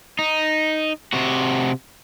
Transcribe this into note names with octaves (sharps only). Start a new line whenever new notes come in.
D#4
C3 F#4